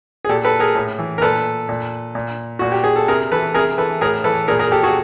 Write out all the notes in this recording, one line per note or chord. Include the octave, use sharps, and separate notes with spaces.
G#4
A#2 G4 A4
A4 B4
G#4 A#4
A2
E3
A#4
A#2 A4 B4
A#2
A#2
A#2 F#4
G4
G#4
A4
C3 G#4 A#4
E3 A4 B4
C3 G#4 A#4
E3 A4 B4
A2 G#4 A#4
E3 A4 B4
A#2 G#4 A#4
G#4 A#4
G4 A4
F#4 G#4